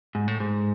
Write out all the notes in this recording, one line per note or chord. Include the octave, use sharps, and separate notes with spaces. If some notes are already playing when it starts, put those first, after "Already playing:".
G#2
A2
G#2